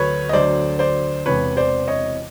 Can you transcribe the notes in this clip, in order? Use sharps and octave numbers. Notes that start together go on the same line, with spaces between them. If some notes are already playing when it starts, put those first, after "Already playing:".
Already playing: D2 D3 F#3 B4 C#5
D#5
D2 D3 F#3 C5 D5
C5 D5
E1 E2 C3 E3 B4 C#5
C5 D5
C#5 D#5